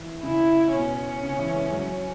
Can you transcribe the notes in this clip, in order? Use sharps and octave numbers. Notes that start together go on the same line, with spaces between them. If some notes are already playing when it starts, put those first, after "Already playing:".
Already playing: E3
C#3 E4
B2 C#4
C#3
E3
G#3
F#3